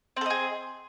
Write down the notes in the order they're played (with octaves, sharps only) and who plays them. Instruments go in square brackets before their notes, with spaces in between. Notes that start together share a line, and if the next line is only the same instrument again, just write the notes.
[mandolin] C4
A4
D#5
G#4